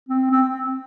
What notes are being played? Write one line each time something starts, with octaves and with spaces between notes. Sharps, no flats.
C4
C4